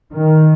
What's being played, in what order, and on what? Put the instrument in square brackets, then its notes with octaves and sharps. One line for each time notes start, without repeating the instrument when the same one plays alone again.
[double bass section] D#3